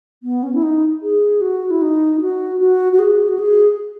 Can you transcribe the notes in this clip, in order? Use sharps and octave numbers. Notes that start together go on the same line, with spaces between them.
B3
C#4
E4
D#4
G#4
F#4
E4
D#4
F#4
F#4
F#4
G#4
F#4
G#4